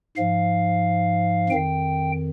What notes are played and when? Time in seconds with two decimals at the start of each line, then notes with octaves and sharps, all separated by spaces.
0.17 G#2 F3 F5
1.50 F2 D#3 G5